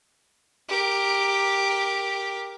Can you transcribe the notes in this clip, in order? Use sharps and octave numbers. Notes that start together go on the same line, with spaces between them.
G4 A#4